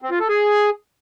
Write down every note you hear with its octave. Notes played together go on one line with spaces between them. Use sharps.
C4
F4
A4
G#4